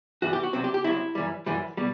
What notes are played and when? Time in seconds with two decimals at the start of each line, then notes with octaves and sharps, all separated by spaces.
0.22 G2 E3 G3 F#4
0.33 G4
0.43 F#4
0.53 C2 C3 F#3 C4
0.64 G4
0.74 G4
0.84 C2 C3 F#3 E4
1.15 F#2 E3 G3
1.46 F#2 E3 G3
1.77 B2 G3